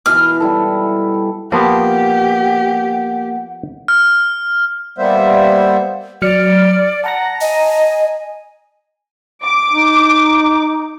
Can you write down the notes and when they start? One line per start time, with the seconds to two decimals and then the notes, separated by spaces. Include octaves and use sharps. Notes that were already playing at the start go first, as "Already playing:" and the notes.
0.06 B2 E3 F6
0.40 G3 E4 A4
1.52 F3 A#3 B3 G4 F#5
3.88 F6
4.98 G3 A#3 B3 C5 E5
6.22 F#3 D5 F6 C#7
7.04 F#5 A5 A#5 A#6
7.41 D#5 G#5
9.44 D6
9.73 D#4